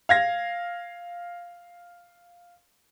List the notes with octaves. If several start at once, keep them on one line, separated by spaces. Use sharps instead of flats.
F5 G#6 A#6